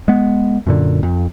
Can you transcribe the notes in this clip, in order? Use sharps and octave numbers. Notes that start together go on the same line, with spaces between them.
G#3 B3
F#2 A#2 D3
F2